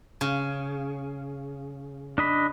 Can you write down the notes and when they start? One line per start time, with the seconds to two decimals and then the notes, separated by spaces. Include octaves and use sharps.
0.21 C#3
2.18 D4 D#5 B5